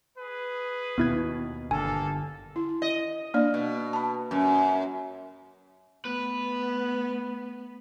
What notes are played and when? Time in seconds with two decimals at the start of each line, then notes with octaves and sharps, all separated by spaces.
0.18 G#4 B4
0.98 D#2 B2 B3 E4 G#6
1.71 G1 D3 A#3 A4 G#5
2.56 E4
2.82 D#5
3.34 A#3 D4 D5
3.54 B2
3.93 A5 B5
4.31 F#2
6.05 A3 B3 B4